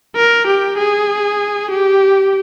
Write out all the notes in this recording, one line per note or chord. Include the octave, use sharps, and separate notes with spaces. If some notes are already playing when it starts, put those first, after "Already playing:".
A#4
G4
G#4
G4